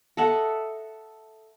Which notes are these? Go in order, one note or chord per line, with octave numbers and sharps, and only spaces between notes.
A4 D#5 E5 F#5